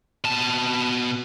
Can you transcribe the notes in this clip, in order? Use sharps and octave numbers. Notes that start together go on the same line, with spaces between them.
B2 A5